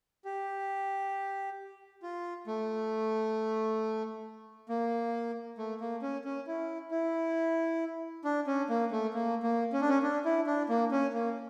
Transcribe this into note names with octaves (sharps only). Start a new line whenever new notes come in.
G4
F4
A3
A#3
A3
A#3
C#4
C#4
E4
E4
D4
C#4
A#3
A3
A#3
A#3
C#4
D4
C#4
D4
E4
D4
A#3
C#4
A#3